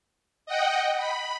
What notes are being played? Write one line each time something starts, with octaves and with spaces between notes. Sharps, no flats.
D#5 F#5 G5
B5